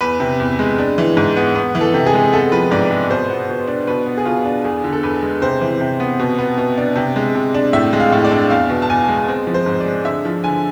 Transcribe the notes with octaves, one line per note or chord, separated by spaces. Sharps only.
E2 B4
C3
E2
G#3
D4
E3
G#2
B3
B3
E3
A4
C3
G#4
G#3
B3 A4
F3 B4
G#2 D5
G#3
B2 C5
B3
B2
D4
B2 B4
B3
G#4
B2 F4
D4
E2 G#4
D3
A4
E2 B4
G#3
C3 C5
E3
C3
B3
B2
B3
B2
D4
C3
G#3
C3
D4
A2 E5
G#3
F5
A2
D5
D4
E2 F5
B2
A5
E2 G#5
G#3
C4
F3
C5
G#2
D5
G#3
D3 E5
F3
D3 G#5